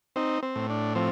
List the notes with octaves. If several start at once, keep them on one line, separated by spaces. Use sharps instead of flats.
C4 D#4
C4
A2
D4
F3 C4